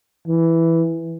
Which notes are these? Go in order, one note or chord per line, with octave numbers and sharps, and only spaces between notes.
E3